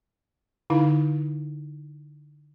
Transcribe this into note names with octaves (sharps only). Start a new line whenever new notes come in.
D3 D#4 E4 F5